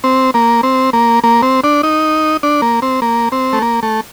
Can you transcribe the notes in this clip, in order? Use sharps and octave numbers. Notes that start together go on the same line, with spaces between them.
C4
A#3
C4
A#3
A#3
C4
D4
D#4
D4
A#3
C4
A#3
C4
A3
A#3
A3